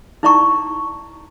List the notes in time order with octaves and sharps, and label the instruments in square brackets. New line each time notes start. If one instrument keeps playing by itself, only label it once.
[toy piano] D#4 E4 D5 A#5 C#6